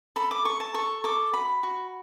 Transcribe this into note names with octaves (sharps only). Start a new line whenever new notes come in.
A4 B5
D6
A4 C#6
A5
A4 C#6
A4 D6
F#4 B5
F#4